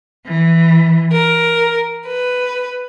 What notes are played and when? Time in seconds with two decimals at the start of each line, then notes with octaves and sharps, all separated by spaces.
0.24 E3
1.12 A#4
2.06 B4